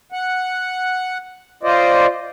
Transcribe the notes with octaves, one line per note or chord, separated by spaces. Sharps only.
F#5
F4 C5 D5 D#5